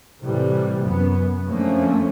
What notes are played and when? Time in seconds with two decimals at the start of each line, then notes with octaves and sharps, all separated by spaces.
0.24 A2 C3 E3 G3
0.84 F#2 B3
1.47 F2 D3 F3 A3 A#3 C#4